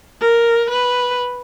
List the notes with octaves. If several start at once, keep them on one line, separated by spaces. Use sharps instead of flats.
A#4
B4